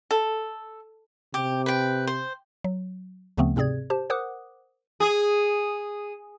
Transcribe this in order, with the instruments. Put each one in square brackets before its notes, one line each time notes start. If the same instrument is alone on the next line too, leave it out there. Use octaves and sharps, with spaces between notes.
[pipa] A4
[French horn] C3 [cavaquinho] G4
[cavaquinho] B4 G5
C5
[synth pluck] F#3
D2 C#3 F3 A3 B3 C4
G#2 C3 C4 G#4 D5 G#6
G4 C5 A5
A#4 C5 F#5 D6 D#6 F#6
[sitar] G#4